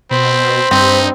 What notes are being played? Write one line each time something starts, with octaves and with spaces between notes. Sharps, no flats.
B2 C4 C5 B5
G2 C4 D#4